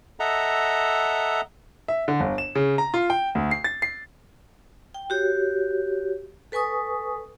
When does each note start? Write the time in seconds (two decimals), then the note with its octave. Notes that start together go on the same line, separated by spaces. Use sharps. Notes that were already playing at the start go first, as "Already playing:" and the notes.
0.20 A4 D#5 E5 F#5 A#5
1.88 E5
2.08 D3
2.20 G1
2.38 E7
2.55 C#3
2.78 A#5
2.94 F4
3.10 G5
3.35 D2
3.51 C7
3.64 A6
3.82 C7
4.94 G5
5.10 F#4 G4 C#5
6.52 A4 B4 G#5 C#6 D#6